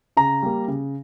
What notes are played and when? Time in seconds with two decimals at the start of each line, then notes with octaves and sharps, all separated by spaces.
0.17 C#3 A#5
0.43 G3 A#3
0.68 C#3